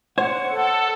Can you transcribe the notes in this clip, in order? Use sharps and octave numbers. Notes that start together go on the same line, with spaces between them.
C5 C#5 F#5
A4